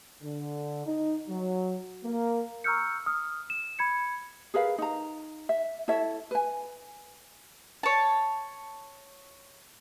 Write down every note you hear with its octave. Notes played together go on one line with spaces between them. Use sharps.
D3
D#4
F#3
A#3
A#5 C#6 E6 F6 G6 C#7
D#6 F6
E7
B5 G#6 C#7
G#4 A#4 B4 F5
D#4 A#5
E5
E4 A4 C#5 E5
B4 G#5
C#5 A5